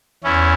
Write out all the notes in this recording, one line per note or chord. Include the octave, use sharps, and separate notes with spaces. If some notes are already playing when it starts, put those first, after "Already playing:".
E2 C#4 E4